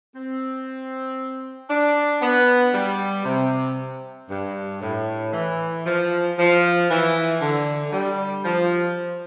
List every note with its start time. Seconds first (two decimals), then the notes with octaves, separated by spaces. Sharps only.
0.15 C4
1.70 D4
2.22 B3
2.75 G3
3.25 C3
4.30 G2
4.82 A2
5.33 E3
5.86 F3
6.38 F3
6.90 E3
7.41 D3
7.93 G3
8.45 F3